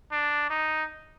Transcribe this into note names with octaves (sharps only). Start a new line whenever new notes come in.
D4
D#4